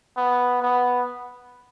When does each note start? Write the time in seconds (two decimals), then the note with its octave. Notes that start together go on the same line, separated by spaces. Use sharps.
0.17 B3
0.62 B3